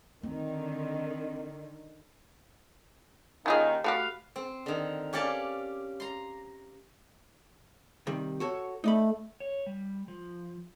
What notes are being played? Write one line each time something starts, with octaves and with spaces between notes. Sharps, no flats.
D3 D#3 C4
D#2 D#3 C#4 F4 G#4
A3 F#4 G4 B4 F5
C4
D3 D#3
C#4 G4 C#5 D5 F5 A5
A#5 C6
C3 D#3 G3
F#4 A4 C#5
A3 D#4 D5 B5
C#5
G3
F3